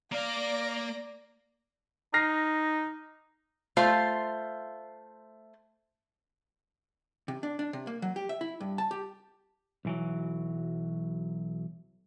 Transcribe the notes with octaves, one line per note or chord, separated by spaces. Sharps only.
A#3 D5 F5 D6 A#6
D#4 F6 A#6 C7
A3 F4 C5 F5
C3
D4
D4
C3
A#3
F#3
G4
E5
E4
G2
A5
G4
B1 E3 F#3